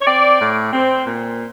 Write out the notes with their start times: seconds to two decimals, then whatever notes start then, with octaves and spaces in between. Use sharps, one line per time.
0.01 C#5
0.07 C4 D5
0.40 A2
0.73 C4
1.06 A#2